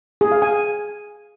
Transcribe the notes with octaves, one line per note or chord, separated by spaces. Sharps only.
G#4
F5
G#5